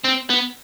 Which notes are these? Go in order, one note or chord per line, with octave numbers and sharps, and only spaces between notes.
C4
B3